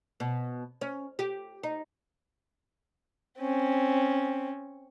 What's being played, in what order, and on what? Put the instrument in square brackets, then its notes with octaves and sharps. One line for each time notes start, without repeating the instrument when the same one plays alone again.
[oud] B2
C#4
G4
D#4
[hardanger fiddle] C4 C#4